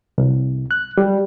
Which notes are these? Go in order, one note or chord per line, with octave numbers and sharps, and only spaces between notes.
C2
F#6
G3